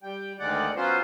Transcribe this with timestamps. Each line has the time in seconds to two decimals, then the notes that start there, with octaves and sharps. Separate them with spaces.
0.03 G3 G5
0.39 D2 D#3 G#3 D5 F#5
0.76 F#3 B3 C#4 F4 C5